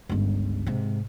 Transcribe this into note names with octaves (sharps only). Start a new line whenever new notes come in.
G1 C#2
G#2 C3